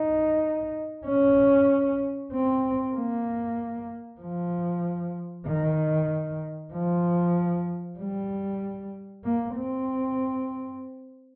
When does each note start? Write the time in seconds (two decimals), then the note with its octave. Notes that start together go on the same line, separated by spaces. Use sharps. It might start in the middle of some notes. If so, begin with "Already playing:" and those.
Already playing: D#4
1.05 C#4
2.32 C4
2.94 A#3
4.21 F3
5.47 D#3
6.73 F3
7.99 G3
9.24 A#3
9.56 C4